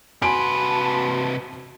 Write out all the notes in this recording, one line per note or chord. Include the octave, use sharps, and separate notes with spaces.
C3 F#4 B4 G#5 A5 C6 D7